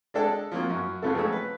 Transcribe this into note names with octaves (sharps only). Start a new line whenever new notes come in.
G#3 D4 A4 G5
F3 F#3 A#3 C4
F#2 F#3
C#3 B3 F4 A4
F2 F#3 G#3 A3 C#4 E6
B4